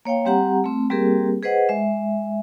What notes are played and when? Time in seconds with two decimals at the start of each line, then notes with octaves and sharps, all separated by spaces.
0.05 A#3 C#5 F5 G5
0.25 G3 C4 G4 F#5 A#5
0.64 A3 C4
0.90 G3 A#3 C4 G4 G#4 A#4
1.43 G#4 B4 C5 D#5 F#5
1.69 G#3 E5